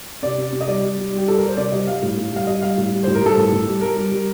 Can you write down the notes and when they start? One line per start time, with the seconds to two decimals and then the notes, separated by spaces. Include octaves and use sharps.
0.22 C3 D5
0.38 C3
0.53 C3
0.61 D#5
0.68 G3 D5
0.83 G3
0.98 G3
1.12 G3
1.18 G4
1.27 G3 A4
1.38 A#4
1.43 G3 C5
1.57 C3 D5
1.72 G3 D#5
1.87 G3 F5
2.02 A2
2.17 A2
2.32 G3 F5
2.47 G3 D#5
2.62 G3 F5
2.78 A2
2.92 G3
3.03 A2 C5
3.15 A#4
3.22 G3 A4
3.37 A2
3.52 A2
3.67 G3
3.81 G3 A#4
3.96 G3
4.12 G3